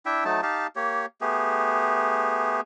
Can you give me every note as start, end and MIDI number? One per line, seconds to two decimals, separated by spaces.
0.06 0.24 62
0.06 0.24 64
0.06 0.24 76
0.06 0.24 79
0.25 0.41 54
0.25 0.41 57
0.25 0.41 63
0.25 0.41 81
0.43 0.67 63
0.43 0.67 67
0.43 0.67 77
0.43 0.67 81
0.76 1.06 58
0.76 1.06 67
0.76 1.06 73
1.21 2.61 57
1.21 2.61 59
1.21 2.61 67
1.21 2.61 68